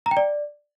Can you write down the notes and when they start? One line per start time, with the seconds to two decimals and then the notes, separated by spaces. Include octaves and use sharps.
0.06 A#5
0.11 G5
0.17 D5